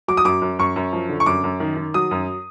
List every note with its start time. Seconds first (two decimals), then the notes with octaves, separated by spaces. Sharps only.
0.08 F#3 D6
0.17 D#6
0.25 F#2 D6
0.42 F#2
0.59 F#2 C#6
0.76 F#2
0.93 F3
1.09 D3
1.20 C#6
1.26 F#2 D6
1.44 F#2
1.60 D#3
1.77 D#3
1.94 F#3 D#6
2.11 F#2